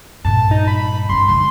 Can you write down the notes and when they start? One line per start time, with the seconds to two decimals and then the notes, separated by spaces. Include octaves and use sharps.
0.25 G2 A#2 A5
0.51 D#4
0.68 B5
1.09 F#2 E3 C6
1.28 D3 G#3 C6